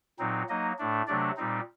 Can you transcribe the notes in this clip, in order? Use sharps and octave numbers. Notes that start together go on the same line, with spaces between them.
A#2 F#3 C4 D#4
F#3 A#3 D#4 D#5
A2 A3 D4
C3 F#3 A3 D4 D5
A#2 G3 C4 D#4